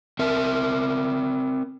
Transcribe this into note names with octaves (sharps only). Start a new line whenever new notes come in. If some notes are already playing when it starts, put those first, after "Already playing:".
C4 A#4 E5